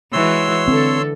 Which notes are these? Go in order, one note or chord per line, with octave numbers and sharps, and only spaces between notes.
E3 G#3 F#4 C#5 C6 E6
D3 C4 A4